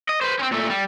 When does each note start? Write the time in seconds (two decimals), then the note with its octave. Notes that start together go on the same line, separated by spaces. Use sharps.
0.09 D#5
0.21 B4 C5
0.39 C4 C#4
0.52 A#2 A3
0.70 G3